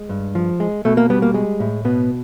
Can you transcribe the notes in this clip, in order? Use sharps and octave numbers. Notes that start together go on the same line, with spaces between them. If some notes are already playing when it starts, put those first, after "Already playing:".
Already playing: G#3
G2
F3
G#3
B2 A3
A#3
G3 B3
A#3
G#3
A2
B2 B3